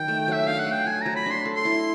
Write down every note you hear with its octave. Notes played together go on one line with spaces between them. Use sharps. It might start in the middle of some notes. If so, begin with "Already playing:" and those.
Already playing: D#3 F#3 G5
A3
F#3 E5
D4 F5
F#5
A3
G5
F#3 G#5
F#3 A#5
B5
D4 C6
A4
C6
E4